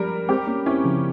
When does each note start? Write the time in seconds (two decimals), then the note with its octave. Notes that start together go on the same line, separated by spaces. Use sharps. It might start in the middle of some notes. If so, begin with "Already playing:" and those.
Already playing: F3 G3 G#3 A#4
0.29 G#3 C4 G4
0.47 A#3 C#4
0.66 C4 C#4 E4
0.84 C#3 F3